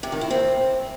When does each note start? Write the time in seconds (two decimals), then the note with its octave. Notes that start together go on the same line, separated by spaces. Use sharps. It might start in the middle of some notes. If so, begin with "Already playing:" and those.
0.03 C3
0.12 D#3
0.21 E4
0.30 C4